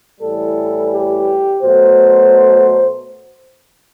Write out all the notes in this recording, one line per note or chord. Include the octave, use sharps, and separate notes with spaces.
A2 E3 G3 A4
G4
B2 F#3 A3 C5